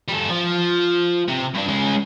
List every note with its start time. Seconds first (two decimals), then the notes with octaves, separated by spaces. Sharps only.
0.08 G3 A4
0.29 F3
1.28 C3
1.55 G2 D4
1.68 G#3 C#4